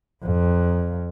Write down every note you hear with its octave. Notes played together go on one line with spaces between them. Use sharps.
F2